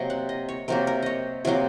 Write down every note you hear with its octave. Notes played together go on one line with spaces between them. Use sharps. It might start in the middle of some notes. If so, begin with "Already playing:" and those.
Already playing: C3 F#3 A#3 D#5
F#5
D#5
C#5
C3 F#3 A#3 A#4
A#4
C#5 D#5
C3 F#3 A#3 G#4